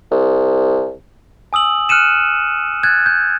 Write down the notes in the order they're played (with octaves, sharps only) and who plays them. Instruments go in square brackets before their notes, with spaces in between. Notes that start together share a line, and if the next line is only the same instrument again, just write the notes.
[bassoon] C2
[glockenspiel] G#5 D#6 E6 F#7
F6 F#6 C#7 D#7 E7
F#6 G#6 A6
G6